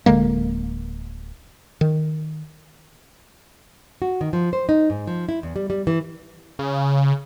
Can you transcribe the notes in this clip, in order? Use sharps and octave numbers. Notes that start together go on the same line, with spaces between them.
D1 D3 G#3 A#3
D#3
F#4
D#3
F3
C5
D#4
G#2
F3
E4
E2
G3
G3
E3
C#3